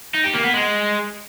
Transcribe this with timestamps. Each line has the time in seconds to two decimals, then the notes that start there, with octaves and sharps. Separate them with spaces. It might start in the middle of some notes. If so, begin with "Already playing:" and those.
0.15 D#4
0.25 G4
0.34 A#3
0.44 B3
0.54 G#3